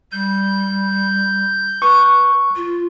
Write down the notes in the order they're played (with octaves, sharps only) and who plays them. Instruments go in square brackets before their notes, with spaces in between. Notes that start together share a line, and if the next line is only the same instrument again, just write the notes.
[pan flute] G3 [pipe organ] G6
[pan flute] B4 [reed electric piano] C#6
[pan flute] F4